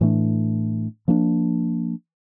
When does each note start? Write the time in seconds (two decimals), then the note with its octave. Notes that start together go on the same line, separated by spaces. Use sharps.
0.01 A2 E3 A3 D4
1.08 F3 A#3 D4